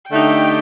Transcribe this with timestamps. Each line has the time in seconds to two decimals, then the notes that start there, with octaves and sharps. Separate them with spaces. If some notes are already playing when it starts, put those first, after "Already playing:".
0.11 D3 A3 D#4 G4 G5